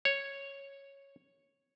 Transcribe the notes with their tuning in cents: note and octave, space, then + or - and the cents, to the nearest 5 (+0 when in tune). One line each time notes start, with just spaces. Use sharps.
C#5 -5